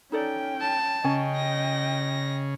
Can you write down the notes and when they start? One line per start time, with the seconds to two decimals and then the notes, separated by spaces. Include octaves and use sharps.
0.12 C#4 D#4 A4 D5 G5
0.61 A5
1.04 C#3 C#4 D#5 G5 G#5
1.36 A#6